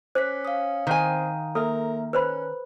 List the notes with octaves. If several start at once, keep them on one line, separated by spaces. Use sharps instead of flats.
C#4 C5 D6 F#6 B6
F5 D#6
D#3 C4 G#5
A#3 A4 A#4 E5
C#4 B4 C5 B5 F#6